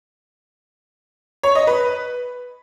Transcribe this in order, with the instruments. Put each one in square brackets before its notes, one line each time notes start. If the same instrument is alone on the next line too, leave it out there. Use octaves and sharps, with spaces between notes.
[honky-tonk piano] C#5
D#5
B4